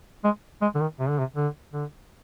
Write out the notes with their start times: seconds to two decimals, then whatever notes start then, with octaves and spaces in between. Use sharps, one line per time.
0.24 G#3
0.62 G#3
0.75 D3
0.80 D#3
0.99 C3
1.09 D3
1.19 C3
1.36 D3
1.73 D3